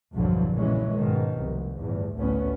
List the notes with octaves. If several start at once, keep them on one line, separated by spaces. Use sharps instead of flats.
B1 E2 G2 D3 F3 F#3
F#1 A#2 E3 G#3 C#4
G#2 B2 D#3
F1 C2
G1 E2 A2
A1 D2 A2 B3 C#4